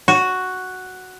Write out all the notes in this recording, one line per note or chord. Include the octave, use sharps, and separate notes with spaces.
F#4